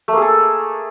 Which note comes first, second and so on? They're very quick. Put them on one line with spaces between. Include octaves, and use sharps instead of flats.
A3 A#3 G#4 A4